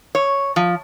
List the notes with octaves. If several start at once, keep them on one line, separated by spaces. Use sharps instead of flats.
C#5
F3